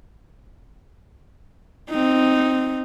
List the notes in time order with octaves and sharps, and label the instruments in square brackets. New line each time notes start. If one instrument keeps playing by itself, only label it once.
[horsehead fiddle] C4 D#4